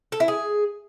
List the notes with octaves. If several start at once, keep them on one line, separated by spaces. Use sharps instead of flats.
A4
E4
G#4